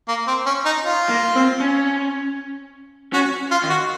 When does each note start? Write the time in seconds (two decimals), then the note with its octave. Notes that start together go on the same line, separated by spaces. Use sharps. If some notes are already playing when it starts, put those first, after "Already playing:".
0.08 A#3
0.28 C4
0.46 C#4
0.65 D#4
0.85 F4
1.10 A#3
1.36 C4
1.61 C#4
3.13 C#4 F#4
3.51 F4
3.64 D#3
3.70 F#4